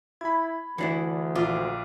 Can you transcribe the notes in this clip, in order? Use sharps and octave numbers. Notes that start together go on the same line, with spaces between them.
E4 B5 G#6
D2 E3 D4 E4
A#1 F4 D6